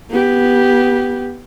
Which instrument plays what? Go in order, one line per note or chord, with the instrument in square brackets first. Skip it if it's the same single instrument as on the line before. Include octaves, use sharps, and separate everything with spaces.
[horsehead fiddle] B3 G4